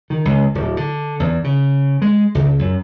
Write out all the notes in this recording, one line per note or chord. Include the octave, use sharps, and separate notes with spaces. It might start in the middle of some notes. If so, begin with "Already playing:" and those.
D#3
C#2
D1
D3
E2
C#3
G#3
C#2
F#2